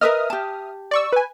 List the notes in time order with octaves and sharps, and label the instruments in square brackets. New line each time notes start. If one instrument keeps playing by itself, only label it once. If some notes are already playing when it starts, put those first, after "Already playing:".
[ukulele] A#4 B4 D#5 [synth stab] E5 D#6 F6
[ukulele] G4 A5
[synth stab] D5 C#6 E6
B4 G#5